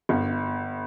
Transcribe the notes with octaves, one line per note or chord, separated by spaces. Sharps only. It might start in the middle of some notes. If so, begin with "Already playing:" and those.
G1